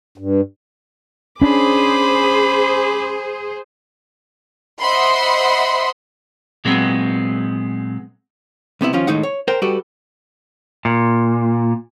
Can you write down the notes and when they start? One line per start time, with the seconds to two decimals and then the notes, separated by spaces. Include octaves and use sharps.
0.18 G2
1.42 C#4 D4 G#4 C5 B5 D6
4.82 C5 D#5 E5 F#5 B5 C6
6.65 A#2 F#3 G#3 B3 C4
8.81 C2 C3 B3 E4
8.93 D#2 F3 C#4 F4
9.07 A2 D#3 G#3 D#4 F#5
9.23 C#5
9.48 A#4 C5 G5
9.62 G3 F#4 G4 A4 B4
10.85 A#2